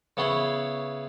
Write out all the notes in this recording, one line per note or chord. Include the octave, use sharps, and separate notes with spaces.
C#3 B3 E4 C#5 C6